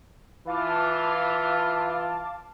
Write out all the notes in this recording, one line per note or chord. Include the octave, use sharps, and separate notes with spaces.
E3 F4 F5 A5 D6